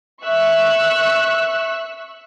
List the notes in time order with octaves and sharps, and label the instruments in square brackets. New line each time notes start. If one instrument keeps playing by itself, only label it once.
[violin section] E5 C#6 E6 F#6